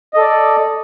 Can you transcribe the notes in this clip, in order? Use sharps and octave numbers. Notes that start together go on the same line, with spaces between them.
A4 D5 D#5